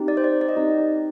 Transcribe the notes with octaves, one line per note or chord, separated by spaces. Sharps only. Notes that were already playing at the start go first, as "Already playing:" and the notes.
Already playing: C4 D#4 G4
D5
C5
D5
D5
D#5
C4 D#4 G4